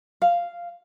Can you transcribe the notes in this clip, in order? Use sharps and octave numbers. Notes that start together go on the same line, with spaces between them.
F5